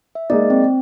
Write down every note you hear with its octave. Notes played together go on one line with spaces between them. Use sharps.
E5
G#3 A#3 D#4 D5
C4